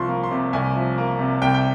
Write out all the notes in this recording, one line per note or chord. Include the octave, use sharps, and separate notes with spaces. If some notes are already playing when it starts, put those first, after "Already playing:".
Already playing: C2 F3 C6 C#6
A#3
C6
C3
C2 G#5
F3
A#3
C3
C2 G5
G5